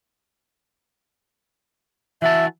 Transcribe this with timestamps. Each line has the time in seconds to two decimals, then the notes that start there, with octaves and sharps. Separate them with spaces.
2.22 E3 F#4 E5 A5